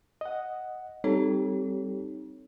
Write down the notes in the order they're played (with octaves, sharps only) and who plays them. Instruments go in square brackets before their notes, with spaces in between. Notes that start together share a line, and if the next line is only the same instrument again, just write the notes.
[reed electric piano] D#5 F#5
[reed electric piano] G3 G4 A4 [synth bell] C4 D#4 C#5